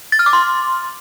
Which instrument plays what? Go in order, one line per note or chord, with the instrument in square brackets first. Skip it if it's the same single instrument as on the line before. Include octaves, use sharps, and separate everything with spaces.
[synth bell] A6
F6
D6
C6